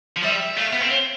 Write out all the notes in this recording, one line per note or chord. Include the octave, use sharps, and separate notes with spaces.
F3
G3 E5
A3 F5
B3
C4